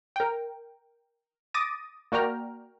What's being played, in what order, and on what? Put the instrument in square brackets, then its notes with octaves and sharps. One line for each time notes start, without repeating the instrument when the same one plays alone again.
[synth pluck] A#4 G5
D6 D#6 A6 A#6 D#7
A#3 F#4 D5 G5 A#5 F6